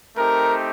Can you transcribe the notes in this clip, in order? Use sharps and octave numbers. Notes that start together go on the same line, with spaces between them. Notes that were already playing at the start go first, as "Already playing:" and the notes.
A3 C4 D#4 G4 A#4